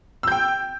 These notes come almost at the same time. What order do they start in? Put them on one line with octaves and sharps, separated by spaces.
E6 G6 G5